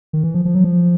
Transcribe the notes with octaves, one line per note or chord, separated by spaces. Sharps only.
D#3
E3
F3
F3
F#3
F3